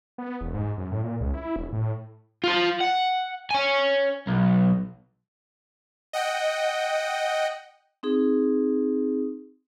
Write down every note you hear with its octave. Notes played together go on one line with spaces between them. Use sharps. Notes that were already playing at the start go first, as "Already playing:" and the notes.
B3
E1
G#2
F#2
A2
A#2
C#2
E4
E1
A2
F4 C5
F#5
C#5 G#5
B1
D#5 F#5 G5
C4 D#4 G#4